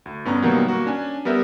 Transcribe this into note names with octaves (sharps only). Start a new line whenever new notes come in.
D2
G2 B3 C#4 D4 A#5
B2 D#3 F#3 G3 A#3 B3
A#3 F#4
C#4 D4 G#5
G3 B3 G4 A#4 E5